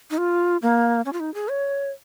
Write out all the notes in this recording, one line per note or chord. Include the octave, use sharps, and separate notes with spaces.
D#4
F4
A#3
C#4
F4
D#4
G#4
C#5